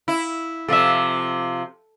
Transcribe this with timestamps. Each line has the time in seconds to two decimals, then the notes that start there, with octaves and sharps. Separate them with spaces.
0.08 E4
0.68 C3 F3 A4 E5